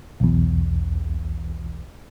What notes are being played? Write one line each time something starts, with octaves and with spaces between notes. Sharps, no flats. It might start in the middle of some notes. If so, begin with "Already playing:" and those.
B1 E2